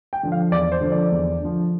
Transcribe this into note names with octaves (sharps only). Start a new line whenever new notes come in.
G5
D3 F3
F5
E2 D5
C5
D3 F3
D5
E2
D3 F3